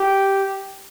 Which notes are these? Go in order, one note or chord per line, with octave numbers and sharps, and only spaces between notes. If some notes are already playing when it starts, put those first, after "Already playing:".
Already playing: G4